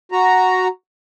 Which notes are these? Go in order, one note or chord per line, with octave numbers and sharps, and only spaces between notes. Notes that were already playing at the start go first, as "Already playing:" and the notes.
F#4 A#5